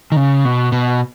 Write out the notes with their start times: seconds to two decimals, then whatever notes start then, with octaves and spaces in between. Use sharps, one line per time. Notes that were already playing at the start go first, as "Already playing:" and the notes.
0.12 D#3
0.16 C#3
0.45 B2
0.72 B2